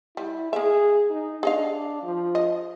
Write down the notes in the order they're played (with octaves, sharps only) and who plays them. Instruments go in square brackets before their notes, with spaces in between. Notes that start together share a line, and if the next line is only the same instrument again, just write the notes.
[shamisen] G3 [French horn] E4
[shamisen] A#3 E5 [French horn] G#4
[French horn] D#4
[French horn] D4 [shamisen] G#4 D#5 F5
[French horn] F3
[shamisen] D#5